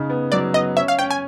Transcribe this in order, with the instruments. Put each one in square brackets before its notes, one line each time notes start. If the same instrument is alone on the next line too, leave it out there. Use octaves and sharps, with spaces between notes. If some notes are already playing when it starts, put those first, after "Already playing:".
Already playing: [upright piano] C#3 D#4
B3
[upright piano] F#3 [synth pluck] D5
[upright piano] B3 [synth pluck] D#5
[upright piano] C#4 [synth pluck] E5
[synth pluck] F5
[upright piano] C#4 [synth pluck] G5
[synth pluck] G#5